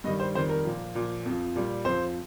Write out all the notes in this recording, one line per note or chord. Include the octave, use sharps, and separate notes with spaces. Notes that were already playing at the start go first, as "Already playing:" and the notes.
G2 D#3 G3 D#5
C5
F2 D#3 G3 C5
A#4
A#2 F3
A#2 F3
F2 F3
A#2 G3
F2 F3 C5